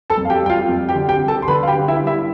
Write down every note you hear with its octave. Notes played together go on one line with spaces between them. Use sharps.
A4 A5
F2
F5
G4 G5
G3 G5
F4 F5
F2
G4 G5
D3
G4 G5
G3
A4 A5
C6
D3 B4 B5
F5
G4 G5
D3
E4 E5
G3
E4 E5